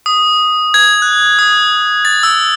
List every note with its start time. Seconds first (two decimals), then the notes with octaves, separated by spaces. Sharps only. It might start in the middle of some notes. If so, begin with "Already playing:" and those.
0.06 D#6
0.74 G#6
1.02 F#6
1.39 D#6
2.05 A6
2.23 E6